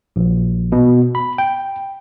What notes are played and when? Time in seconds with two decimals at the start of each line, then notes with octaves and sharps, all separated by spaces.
0.16 A#1
0.72 B2
1.15 B5
1.38 G5